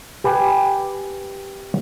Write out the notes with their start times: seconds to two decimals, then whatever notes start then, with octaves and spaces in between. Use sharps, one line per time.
0.24 G4 B4 G5 G#5